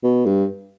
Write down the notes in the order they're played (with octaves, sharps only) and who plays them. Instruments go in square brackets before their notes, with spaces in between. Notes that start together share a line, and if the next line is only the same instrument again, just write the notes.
[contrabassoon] B2
G2